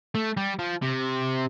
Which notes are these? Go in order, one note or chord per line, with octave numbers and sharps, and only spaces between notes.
A3
G3
F3
C3